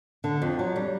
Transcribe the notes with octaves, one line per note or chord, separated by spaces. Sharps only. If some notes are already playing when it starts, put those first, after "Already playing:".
D3
F2
F#3
G3